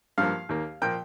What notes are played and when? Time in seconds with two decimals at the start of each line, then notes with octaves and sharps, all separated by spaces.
0.18 G2 F3 A#3 F5
0.49 D#2 D#3 A#3
0.82 A#2 F3 A#3 G5